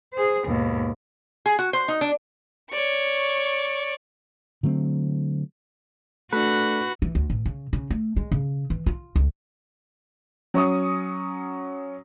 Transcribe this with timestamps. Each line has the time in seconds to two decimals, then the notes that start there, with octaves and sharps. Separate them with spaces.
0.14 G#4 C5
0.46 D#2 G#2 B2
1.46 G#4
1.59 F#4
1.73 C5
1.88 D#4
2.01 D4
2.71 C#5 D5 C#6
4.63 D3 F#3 A3 C4
6.33 A3 D4 F#4 B4
7.02 E3
7.15 D2
7.30 A1
7.46 C#3
7.73 C#3
7.90 A3
8.16 G#3
8.31 C#3
8.70 E3
8.86 F4
9.16 C#2
10.54 F#3 C#4 C#6 D#6